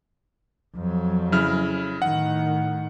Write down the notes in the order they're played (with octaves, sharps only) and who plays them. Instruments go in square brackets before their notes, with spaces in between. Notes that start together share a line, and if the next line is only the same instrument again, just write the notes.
[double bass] F2 F#3
[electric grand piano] C#3 E4 F6
[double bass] A2 D#3 [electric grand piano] F#5